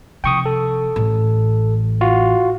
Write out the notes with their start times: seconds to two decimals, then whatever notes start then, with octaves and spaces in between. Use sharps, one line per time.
0.24 C3 F3 G5 C#6 D#6
0.46 A4
0.96 A1
2.01 F4 F#4